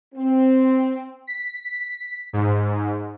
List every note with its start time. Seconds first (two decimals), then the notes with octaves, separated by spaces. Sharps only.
0.14 C4
1.27 B6
2.33 G#2